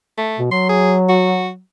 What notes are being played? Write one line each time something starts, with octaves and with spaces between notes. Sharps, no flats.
A3
B2
F#3 C6
G#4
F#4